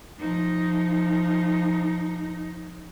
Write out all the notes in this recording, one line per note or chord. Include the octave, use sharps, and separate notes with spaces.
F3 D#4